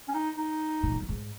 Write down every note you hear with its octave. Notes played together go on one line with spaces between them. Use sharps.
C#4
D#4
D#4
A#2
G#2
F#2
G#2